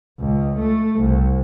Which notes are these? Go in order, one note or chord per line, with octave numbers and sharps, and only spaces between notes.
C#2
A3
C2